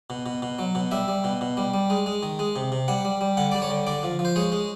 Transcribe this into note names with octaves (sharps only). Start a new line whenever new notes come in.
B2
B2
B2
F#3
B2
G3 E5
G3
B2
B2
G3
G3
G#3
G#3
D#3
G#3
C3
C3
G3 F#5
G3
G3
D3 F#5
G3 D5
C#5
D3
D3 D5
F3
F3
C5
G#3 C#5
G#3